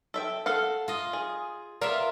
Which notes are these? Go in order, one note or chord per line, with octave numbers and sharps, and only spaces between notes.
A4 E5 G5
A4 F5 F#5
F4 D#5
G#4
B3 F4 A#4 D5 E5